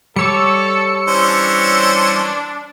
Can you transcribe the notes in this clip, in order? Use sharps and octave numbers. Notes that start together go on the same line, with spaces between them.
G3 A4 C#5 D6 E6 C#7
E3 C#4 D4 C5